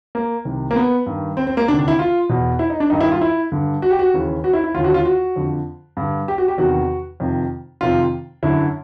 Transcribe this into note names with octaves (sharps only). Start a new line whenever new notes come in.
A#3
C2 C3 D#3
A#3
B3
G2 D#3
C4
C4
A#3
D2 C3 D#3 D4
D4
E4
F4
E2 B2
E4
D#4
D4
G2 D#3 D#4
E4
F4
E4
G2 D3
F#4
G4
F#4
D#2 C#3 E3
F#4
E4
E4
D#2 D3 F4
F#4
F4
F#4
F2 D3
G2 D3
G4
F#4
G4
E2 C3 D#3 F#4
F2 C3 D#3
F2 C3 D#3 F4
F#2 D3 E4